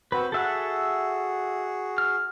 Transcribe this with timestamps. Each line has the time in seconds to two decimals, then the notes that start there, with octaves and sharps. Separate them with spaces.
0.12 C4 F#4 B4 C5
0.32 F#4 G#4 A4 E5 F#5
1.98 F6